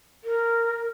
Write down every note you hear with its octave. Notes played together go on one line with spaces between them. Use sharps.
A#4